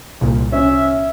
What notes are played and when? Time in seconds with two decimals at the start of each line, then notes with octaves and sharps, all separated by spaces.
0.21 C2 A#2
0.52 C#4 E5